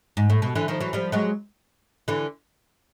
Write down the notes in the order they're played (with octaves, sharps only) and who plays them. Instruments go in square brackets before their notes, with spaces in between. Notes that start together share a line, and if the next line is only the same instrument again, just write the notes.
[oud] G#2
A2
B2
D3 E3
D#3 F3
E3 F#3
F3 G3
F#3 G#3
D3 E3